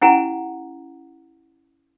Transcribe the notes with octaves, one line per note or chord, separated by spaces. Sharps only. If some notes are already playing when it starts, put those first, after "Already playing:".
C#4 E4 G4 F#5 G#5 A#5